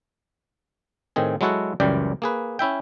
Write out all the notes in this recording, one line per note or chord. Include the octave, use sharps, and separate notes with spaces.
A2 D#3 C4 G#4
F#3 G#3 E4 F#4 A4 F#5
C#2 F#2 E3 G3 D5 G5
A#3 G#4 B4
C#4 E4 E5 G5